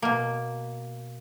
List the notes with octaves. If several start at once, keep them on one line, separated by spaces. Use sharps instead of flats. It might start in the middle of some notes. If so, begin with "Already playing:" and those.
B2 A#3